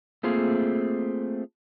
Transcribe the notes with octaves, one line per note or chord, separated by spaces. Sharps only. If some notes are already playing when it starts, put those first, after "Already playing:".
A3 A#3 C4 F4 G#4